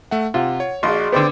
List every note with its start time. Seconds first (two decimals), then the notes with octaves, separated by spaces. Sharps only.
0.11 A3 E5 F#5
0.34 C3 F4 F#5
0.60 C#5
0.83 A#1 F#4 G#4 D5 D#5 C6 F6
1.12 D3 B3 C4 C5 D5